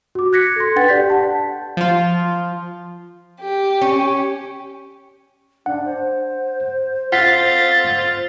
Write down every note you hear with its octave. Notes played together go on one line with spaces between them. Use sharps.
F#4 D6
F#6 G#6 A#6 B6 C#7
A4 C6
D4 B4 F#5 G5 A6
G4 D5 G6 B6
F#5 A5
F3 F4
G4
C#4
D4 F#5
C5
F4 F#5 A6 B6 C7